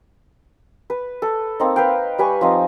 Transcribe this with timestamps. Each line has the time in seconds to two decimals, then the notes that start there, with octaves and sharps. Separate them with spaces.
0.90 B4
1.22 A4
1.60 A#3 C4 D#4
1.76 B4 F5 G5
2.18 G3 B4 G#5 C#6
2.41 F3 C4 D#4